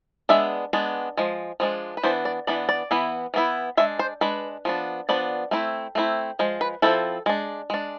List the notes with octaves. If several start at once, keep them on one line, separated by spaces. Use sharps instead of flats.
G#3 B3 D4 E5
G#3 B3 D4
F3 G#3
F3 G#3 D4
B4
E3 B3 D4 C5
D5
E3 B3 D4 D5
D5
E3 B3 E4
E3 B3 E4
G#3 D4 E5
C5
G#3 D4 B4
F3 B3 D4
F3 B3 D4 D5
A3 C4 E4
A3 C4 E4
F3 G#3
B4
F3 G#3 C4 E4 A4
G#3 D4
G#3 D4